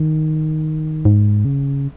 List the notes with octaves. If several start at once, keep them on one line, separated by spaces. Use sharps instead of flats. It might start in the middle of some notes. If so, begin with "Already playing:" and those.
Already playing: D#3
G#2
C#3